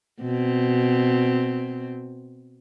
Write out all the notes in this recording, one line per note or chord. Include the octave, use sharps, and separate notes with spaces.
B2 C4